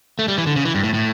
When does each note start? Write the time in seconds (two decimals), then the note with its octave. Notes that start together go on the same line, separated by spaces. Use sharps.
0.19 A3
0.28 G3
0.38 E3
0.46 D3
0.56 C#3
0.65 E3
0.75 G2
0.84 A2
0.94 A2